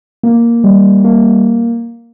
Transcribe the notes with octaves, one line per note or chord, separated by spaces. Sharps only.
A#3
G3
A#3